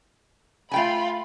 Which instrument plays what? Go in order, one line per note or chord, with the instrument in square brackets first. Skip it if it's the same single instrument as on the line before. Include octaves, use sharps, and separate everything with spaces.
[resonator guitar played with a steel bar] A3 G5 G#5 [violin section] F4 B5